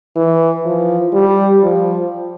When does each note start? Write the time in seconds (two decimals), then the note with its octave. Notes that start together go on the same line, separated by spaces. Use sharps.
0.16 E3
0.65 F3
1.13 G3
1.63 F3